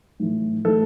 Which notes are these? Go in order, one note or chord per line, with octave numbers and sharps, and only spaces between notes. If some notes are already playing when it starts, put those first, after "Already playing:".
A2 E3
A2 E3 A4